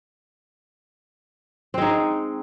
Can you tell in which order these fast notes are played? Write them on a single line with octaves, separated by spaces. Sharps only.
C4 G#3 D#4